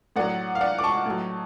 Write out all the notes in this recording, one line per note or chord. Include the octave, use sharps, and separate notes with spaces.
A2 F#3 D5 F#5
F5
D5 F#5
D6
A5 C#6
A2 F#3